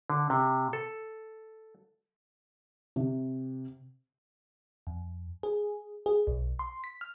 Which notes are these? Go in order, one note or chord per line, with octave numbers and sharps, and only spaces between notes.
D3
C3
A4
C3
F2
G#4
G#4
B1
C6
B6
F6